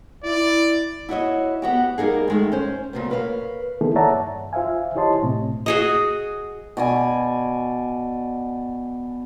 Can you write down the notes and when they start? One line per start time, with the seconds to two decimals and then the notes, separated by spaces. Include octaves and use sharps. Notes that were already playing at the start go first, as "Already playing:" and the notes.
0.24 E4 D5
1.09 E4 F#4 C#5 D#5
1.62 B3 F#4 G4
1.98 G3 A#3 D#4 G#4
2.28 D#3 G#3 A3
2.52 C#4 C5
2.93 A#2 C#3 F#3 A3 B3
3.10 A#4 B4 C#5 D#5 F5
3.81 D#3 A#3 B3 E4 G#4 A4
3.96 C#5 D5 E5 F#5 A5 A#5
4.14 G2
4.53 F4 C5 E5 F5 G#5
4.96 E4 G4 C#5 D#5 A5 C6
5.23 A2 C3 C4
5.66 F#4 G#4 D#5
6.77 B2 D5 G#5